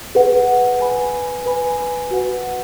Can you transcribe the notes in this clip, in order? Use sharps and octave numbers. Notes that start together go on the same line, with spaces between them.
G#4 B4 F#5
B4 G#5 B5
B4 G#5 B5
F#4 B4 F#5